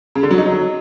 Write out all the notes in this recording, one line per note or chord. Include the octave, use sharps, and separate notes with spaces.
C#3
D3
F#3
D#4
F#3